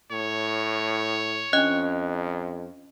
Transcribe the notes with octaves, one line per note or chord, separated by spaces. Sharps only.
A2 C#5
F2 C#4 D4 D#5 F#6